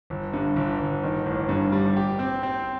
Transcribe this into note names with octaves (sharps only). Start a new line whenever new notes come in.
G1
G2
G1
G1
D#3
A1
G2
G3
G4
C4
C4